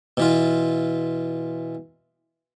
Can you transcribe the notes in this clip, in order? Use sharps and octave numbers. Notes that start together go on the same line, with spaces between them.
B2 E3 F4